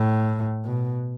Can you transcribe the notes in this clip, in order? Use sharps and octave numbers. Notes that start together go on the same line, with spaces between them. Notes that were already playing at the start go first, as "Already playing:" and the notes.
Already playing: A2
B2